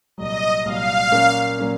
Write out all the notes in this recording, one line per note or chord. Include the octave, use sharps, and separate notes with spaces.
C2 A#2 F#3 D#5
C2 A#2 F#3 F5
A#2 F#3 A#3 C#4
A#2 F#3 A#3 C#4